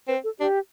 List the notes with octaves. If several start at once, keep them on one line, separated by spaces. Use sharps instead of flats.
C4 B4
A4
D4 G4